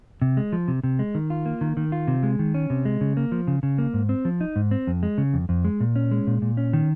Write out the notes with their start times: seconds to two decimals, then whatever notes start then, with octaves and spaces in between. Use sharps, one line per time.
0.22 C3
0.37 G#3
0.53 F3
0.68 C3
0.84 C3
0.99 G#3
1.15 D#3
1.30 F4
1.46 A#3
1.61 D#3
1.77 D#3
1.92 F4
2.08 C3
2.23 G#3
2.39 D#3
2.54 C#4
2.70 C3
2.85 G#3
3.01 C#3
3.17 A#3
3.32 F3
3.47 C#3
3.63 C#3
3.78 A#3
3.94 G#2
4.09 C4
4.25 F3
4.41 D#4
4.56 G#2
4.71 C4
4.87 F2
5.03 G#3
5.18 C#3
5.34 F2
5.49 F2
5.65 G#3
5.80 A#2
5.96 C#4
6.11 G#3
6.27 A#2
6.42 A#2
6.57 C#4
6.73 D#3